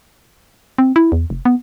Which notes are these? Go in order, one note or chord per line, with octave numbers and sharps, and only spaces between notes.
C4
E4
E2
F1
B3